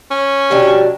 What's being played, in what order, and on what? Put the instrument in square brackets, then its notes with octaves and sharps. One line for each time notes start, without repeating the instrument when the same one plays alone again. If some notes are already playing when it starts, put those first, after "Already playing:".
[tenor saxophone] C#4
[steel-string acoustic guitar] B2 F#3 D4 [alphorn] G4